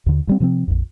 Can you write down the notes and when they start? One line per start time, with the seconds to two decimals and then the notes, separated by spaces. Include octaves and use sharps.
0.06 D#2 D3
0.27 G2 G3 C4
0.40 C3 F3 A#3 C4
0.68 A#1 F2